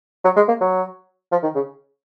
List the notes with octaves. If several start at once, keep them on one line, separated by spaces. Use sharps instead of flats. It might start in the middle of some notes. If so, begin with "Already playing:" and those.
F#3
G#3
A#3
F#3
F3
D#3
C#3